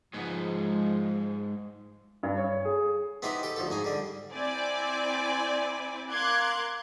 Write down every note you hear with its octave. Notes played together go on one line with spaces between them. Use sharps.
G#2 F3 G#3 B3
G2
C#5
G#4
B3 C4 D#4 E4 G4
G4 A4
D2 F3 A4
G#2 D#4 G#5
D3 G3
C4 E4 D5 G#5
A#4 F5 C6 D6 F#6 G#6